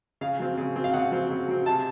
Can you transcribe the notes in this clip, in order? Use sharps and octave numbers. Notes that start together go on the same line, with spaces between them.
C#3 F5
F#3 C4
C#3
F#3 C4
F5
C#3 F#5
F#3 C4
C#3
F#3 C4
C3 A5